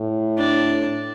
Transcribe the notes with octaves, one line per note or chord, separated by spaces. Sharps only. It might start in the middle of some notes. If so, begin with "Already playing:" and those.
Already playing: A2
D4